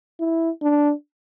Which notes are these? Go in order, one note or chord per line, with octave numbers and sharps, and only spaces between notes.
E4
D4